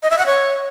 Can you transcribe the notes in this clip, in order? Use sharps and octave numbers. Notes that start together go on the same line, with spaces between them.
D#5
E5
F#5
C#5